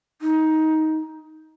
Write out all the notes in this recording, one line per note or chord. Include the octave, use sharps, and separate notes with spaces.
D#4